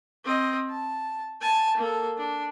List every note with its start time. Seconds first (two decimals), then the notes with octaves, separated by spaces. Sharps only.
0.25 C4 D#5
0.70 A5
1.41 G#5 A5
1.77 A#3 A4
2.18 D4